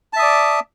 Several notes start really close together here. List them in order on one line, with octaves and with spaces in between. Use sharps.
A5 E5 D#6 D5